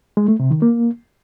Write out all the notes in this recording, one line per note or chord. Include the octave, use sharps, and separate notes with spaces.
G#3
A3
C3
D#3
A#3